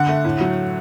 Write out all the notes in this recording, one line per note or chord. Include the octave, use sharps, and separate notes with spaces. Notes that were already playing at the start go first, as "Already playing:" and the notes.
Already playing: D3 F#5
A3
A2
F#3